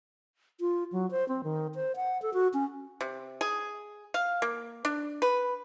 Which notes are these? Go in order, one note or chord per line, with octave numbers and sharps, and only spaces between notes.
F4
F#3
C5
C4
D#3
C5
F#5
A4
F#4
C#4
C3
G#4
F5
A#3
D4
B4